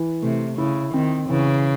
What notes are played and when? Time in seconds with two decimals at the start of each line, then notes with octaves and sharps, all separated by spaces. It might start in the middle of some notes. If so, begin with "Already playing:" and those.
Already playing: E3
0.22 C3 A3
0.58 C#3 E4
0.94 D#3 C4
1.29 C#3 E3